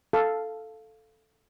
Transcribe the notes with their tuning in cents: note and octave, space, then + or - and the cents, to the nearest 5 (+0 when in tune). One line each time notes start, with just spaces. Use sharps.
A4 +0 F5 +0